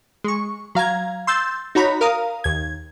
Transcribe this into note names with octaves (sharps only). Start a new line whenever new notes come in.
G#3 C#6
F#3 F5 A#5 G#6
C6 E6 G6 A6
D#4 F#4 C#5 A#5 B5
A#4 F5 A#5 D#6
D#2 G#6